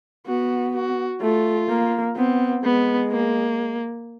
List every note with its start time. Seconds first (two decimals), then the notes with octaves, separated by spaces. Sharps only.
0.27 B3 F#4
0.74 F#4
1.21 A3 F4
1.69 A#3
2.16 B3 C4
2.64 G#3 B3
3.12 A#3